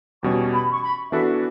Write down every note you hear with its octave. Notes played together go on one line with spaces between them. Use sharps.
E2 B2 G3 C#4 C#6
B5
C#6
B5
E3 B3 D4 F#4 A4 E5